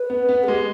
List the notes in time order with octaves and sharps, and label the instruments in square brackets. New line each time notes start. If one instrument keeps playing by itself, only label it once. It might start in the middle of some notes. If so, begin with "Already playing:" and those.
Already playing: [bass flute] B4
[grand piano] B3
B3
[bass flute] G#4
[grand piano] G#3 [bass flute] G4